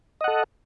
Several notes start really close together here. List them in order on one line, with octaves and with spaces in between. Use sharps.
D#5 F#5 A4